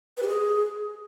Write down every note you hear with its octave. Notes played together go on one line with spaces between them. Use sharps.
B4
G4
G#4